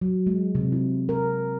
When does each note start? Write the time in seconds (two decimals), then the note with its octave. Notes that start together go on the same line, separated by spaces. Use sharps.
0.02 F#3
0.27 G#3
0.55 C3
0.72 E4
1.09 A#4